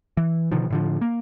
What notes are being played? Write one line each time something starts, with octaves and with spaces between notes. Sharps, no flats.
E3
B2 D3 D#3 F3
A2 D3 F3
A#3